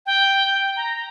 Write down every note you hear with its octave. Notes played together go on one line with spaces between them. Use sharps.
G5
A#5